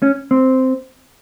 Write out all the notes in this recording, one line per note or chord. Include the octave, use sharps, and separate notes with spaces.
C#4
C4